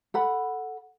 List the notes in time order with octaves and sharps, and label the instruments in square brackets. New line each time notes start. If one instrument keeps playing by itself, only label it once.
[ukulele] A4 F#5 B5